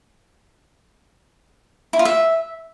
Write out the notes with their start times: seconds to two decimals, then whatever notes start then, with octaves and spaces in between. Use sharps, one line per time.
1.93 E4
1.99 F4
2.05 E5